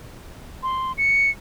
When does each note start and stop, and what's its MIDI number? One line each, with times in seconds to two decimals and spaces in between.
0.63 0.92 84
0.98 1.30 97